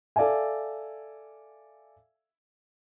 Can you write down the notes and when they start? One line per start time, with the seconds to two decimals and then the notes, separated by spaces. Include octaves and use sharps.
0.16 A4 D5 E5 F5 G#5